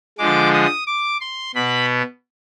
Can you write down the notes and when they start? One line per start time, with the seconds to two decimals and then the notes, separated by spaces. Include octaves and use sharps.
0.18 D3 F3 G#3 D6
0.53 D#6
0.87 D6
1.21 C6
1.55 B2 B3 B5